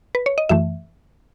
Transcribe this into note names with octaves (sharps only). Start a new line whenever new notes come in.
B4
C#5
D#5
F#2 E3 A3 E5